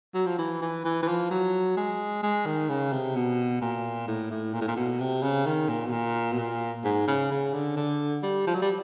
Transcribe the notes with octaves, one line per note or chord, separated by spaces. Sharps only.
F#3
F3
E3
E3
E3
E3
F3
F#3
G#3
G#3
D#3
C#3
C3
B2
A#2
A2
A2
A#2
A2
A#2
B2
C3
C#3
D#3
A#2
B2
A#2
B2
A#2
G#2
C#3
C#3
D3
D3
G3
F3
F#3
G3